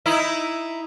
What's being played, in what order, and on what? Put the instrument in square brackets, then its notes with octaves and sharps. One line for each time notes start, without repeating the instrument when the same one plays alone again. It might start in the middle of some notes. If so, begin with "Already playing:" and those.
[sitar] D#4 E4